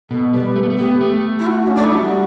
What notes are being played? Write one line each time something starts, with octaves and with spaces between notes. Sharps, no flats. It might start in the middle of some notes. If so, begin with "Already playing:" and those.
B2 A4
G3 B4
A3
B3
A3
B3 G4
A3
E4
F#4
C#4
D4
A3 E4
G3 F#4